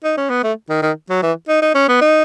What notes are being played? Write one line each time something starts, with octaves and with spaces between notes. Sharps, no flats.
D#4
C#4
B3
A3
D#3
D#3
F#3
E3
D#4
D#4
C#4
B3
D#4